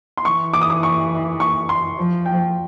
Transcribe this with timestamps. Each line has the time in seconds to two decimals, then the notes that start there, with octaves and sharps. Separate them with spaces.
0.17 C6
0.25 E3 C#6
0.53 D6
0.62 D#6
0.70 D6
0.83 C#6
1.40 C#6
1.69 C6
1.98 F3
2.26 G5